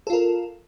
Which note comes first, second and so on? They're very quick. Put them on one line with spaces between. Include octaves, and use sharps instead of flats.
A4 F4 A#4